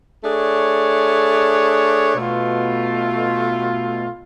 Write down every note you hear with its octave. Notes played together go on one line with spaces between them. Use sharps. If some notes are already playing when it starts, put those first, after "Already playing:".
A3 D4 G#4 C#5
B2 A3 F4